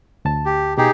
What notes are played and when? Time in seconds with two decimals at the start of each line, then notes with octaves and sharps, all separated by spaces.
0.25 D2 A5
0.46 G4
0.78 B2 D#4 G4 G#4